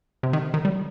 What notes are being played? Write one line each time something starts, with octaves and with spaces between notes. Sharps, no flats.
C3
D#3
D#3
G3